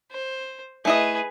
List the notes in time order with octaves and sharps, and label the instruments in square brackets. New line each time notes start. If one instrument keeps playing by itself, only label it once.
[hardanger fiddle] C5
[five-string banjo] A3 E4 D#5 [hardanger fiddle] G#4 B4